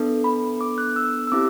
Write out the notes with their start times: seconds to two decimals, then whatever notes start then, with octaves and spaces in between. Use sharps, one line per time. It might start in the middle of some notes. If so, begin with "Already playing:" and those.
Already playing: B3 D4 A4
0.24 B5
0.61 D6
0.78 F#6
0.96 E6
1.27 E6
1.32 C4 E4 G4 D6